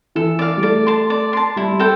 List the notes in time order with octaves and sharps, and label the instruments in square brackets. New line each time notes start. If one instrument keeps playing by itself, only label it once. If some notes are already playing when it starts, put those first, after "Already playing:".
[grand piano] E3 [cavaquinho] A4
[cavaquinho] D5 F5
[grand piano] G3
[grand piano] A3 [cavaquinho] D5
[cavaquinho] A5 C6
D5
A5 C6
[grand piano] G3 [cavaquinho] E4
[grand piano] G3
[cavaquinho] A4 C5 G5